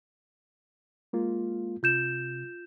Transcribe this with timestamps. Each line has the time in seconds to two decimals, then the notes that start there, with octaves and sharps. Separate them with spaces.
1.13 G#3 A#3 F4
1.83 C3 F4 G6 E7